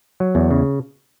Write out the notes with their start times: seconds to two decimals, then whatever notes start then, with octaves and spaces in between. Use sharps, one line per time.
0.20 F#3
0.35 E2
0.51 C#3